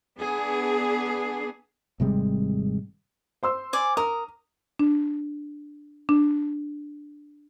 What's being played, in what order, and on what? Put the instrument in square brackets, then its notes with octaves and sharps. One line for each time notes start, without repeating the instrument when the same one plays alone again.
[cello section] B3 D4 G#4
[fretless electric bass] G#1 C3 G3 G#3
[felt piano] C5 C6 E6
[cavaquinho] D5 G#5
[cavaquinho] A#4 [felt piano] D#6
[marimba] D4
D4